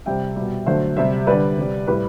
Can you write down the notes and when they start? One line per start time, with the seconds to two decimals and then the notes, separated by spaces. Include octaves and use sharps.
0.06 C3 G3 E5 G5
0.36 B2 G3
0.66 D3 F#3 A3 C5 E5
0.97 C3 G3 C5 E5
1.27 D3 G3 B4 D5
1.58 C3 G3
1.87 A2 G3 G4 B4